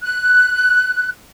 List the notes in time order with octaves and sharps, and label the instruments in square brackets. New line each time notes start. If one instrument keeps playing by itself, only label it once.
[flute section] F#6